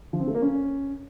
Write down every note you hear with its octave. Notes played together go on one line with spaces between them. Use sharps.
F3
C4
A3
A#3
C#4